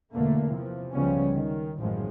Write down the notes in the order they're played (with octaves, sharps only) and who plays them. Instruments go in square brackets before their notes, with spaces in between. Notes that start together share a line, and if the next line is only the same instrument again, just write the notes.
[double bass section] E2 B2 D3 A3 A#3
C3 E3 F3
C#2 C#3 F3 G3 B3 C#4
D#3
A1 F#2 A2 D#3 F3 G#3